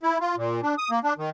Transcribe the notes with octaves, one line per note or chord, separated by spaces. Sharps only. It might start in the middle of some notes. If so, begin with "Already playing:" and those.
E4
F4
A#2
D4
D#6
A#3
D4
D#3